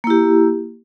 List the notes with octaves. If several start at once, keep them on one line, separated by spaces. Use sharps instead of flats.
A#3 E4 G4